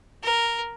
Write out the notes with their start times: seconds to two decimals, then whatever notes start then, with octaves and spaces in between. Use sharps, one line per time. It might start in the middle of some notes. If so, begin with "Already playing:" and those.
0.23 A#4